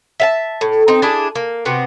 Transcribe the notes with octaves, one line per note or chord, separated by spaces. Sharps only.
E5 F5 A5
A2
C4 D#4
D4 E4 G#4 A5
A#3
C3 B3 C4 F#4